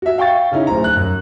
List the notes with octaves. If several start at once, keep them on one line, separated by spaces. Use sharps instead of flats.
F#4 E5
F5 G5 C#6 A6
C#3 C#4 D#4 E4
D1 C5 A#5
F#6
F#2